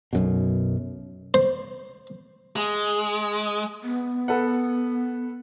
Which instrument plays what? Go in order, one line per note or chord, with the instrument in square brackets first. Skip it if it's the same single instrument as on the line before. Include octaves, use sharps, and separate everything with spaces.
[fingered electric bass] B1 F#2 B2
[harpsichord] C5
[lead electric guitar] G#3
[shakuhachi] B3
[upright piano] A4 B4 F#5